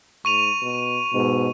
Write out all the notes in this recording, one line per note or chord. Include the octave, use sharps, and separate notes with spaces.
G#2 C#6 D#7 F7
B2
G#2 B2